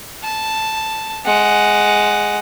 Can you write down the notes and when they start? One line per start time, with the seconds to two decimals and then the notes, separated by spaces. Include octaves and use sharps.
0.24 A5
1.26 G#3 F#5